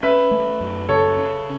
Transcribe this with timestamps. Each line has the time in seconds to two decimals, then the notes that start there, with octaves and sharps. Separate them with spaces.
0.03 C#4 B4 E5
0.31 A3
0.60 F#2
0.89 C#3 A4 C#5
1.17 C#4